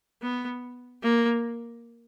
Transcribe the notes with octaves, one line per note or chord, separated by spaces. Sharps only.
B3
A#3